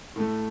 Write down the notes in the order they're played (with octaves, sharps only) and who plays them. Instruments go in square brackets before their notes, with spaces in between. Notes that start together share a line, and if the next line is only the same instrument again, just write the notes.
[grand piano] A2 A3 A4